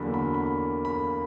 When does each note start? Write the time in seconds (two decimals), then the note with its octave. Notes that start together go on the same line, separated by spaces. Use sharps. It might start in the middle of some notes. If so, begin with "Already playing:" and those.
Already playing: E2 D3 F#3 A#3 B5
0.14 B5
0.34 B5
0.85 B5